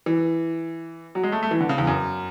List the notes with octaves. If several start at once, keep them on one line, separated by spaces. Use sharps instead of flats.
E3
F#3
G#3
A3
A3
E3
D3
C#3
E2
F#2